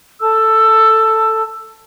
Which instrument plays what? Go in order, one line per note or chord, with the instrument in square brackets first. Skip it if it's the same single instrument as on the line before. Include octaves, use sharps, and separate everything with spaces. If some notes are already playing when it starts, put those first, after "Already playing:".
[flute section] A4 A5 E6